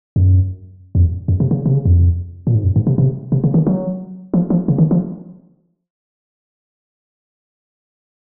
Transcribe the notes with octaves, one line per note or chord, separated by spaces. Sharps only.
F#2
F2
F#2
C3
C#3
C3
C#3
F2
A#2
G#2
F#2
G#2
C3
C3
C3
C#3
D#3
F#3
F3
F3
C#3
D#3
F3